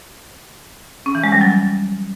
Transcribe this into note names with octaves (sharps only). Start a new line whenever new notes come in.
C#4
E3
G#3
G3
F#3